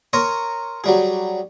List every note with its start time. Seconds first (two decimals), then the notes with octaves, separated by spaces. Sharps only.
0.13 A#4 C#5 A#5 C6 D#6
0.84 F#3 G3 G#4